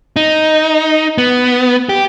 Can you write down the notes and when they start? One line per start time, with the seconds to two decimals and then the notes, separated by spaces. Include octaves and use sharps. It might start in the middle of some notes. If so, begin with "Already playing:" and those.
0.16 D#4
1.18 B3
1.89 G4